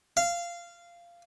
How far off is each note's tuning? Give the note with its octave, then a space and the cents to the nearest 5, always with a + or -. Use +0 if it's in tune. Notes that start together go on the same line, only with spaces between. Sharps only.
F5 -15